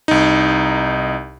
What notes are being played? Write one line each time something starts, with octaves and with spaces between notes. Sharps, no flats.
C2 D#4